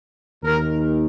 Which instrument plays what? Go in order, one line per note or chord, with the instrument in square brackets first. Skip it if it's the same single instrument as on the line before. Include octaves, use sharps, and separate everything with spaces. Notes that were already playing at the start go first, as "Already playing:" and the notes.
[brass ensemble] D#2 D#3 A#4